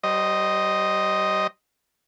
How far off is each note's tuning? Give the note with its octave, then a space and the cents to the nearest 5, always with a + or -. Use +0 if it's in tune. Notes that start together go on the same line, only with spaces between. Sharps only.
G3 -35 C5 +0 D#5 +0